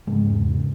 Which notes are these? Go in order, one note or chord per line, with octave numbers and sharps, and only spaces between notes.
G#2 C#3 G#3
E2
C#3